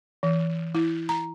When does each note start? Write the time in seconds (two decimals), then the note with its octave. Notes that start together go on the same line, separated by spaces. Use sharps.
0.23 E3
0.75 E4
1.09 A#5